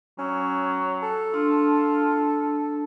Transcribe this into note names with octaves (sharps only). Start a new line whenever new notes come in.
F#3 C#4
A4
D4 F4